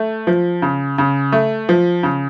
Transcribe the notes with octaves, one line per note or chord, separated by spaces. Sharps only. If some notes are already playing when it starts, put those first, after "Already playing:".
Already playing: A3
F3
C#3
C#3
A3
F3
C#3